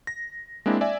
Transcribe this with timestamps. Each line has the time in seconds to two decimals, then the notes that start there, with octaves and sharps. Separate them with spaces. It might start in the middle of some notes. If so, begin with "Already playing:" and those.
0.07 A#6
0.66 G#3 A#3 C4 D4 E4
0.81 D5 E5 G#5